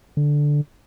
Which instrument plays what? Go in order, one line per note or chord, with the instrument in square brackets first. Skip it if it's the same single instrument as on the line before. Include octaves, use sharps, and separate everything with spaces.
[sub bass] D3